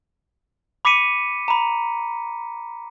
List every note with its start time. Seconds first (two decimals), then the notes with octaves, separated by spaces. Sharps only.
0.85 B5 D6 B6 C#7 D#7
1.48 A#5 B5